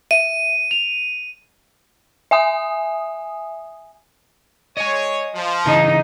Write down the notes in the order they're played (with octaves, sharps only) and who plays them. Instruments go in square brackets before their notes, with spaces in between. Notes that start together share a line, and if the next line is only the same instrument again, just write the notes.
[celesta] E5 [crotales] D#7
[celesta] F7
[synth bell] E5 G#5 D#6
[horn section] C#5 [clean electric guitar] D#5 G#5
[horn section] F3
[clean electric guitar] C#3 E3 G#4 [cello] D#4